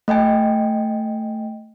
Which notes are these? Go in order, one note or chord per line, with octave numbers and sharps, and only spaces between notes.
A3 D#5 G5 G#5